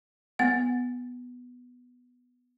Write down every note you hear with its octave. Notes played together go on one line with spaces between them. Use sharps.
B3 F#5